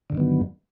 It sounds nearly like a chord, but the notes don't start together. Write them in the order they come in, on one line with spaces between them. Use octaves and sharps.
D3 G2 D#3 B3 F#3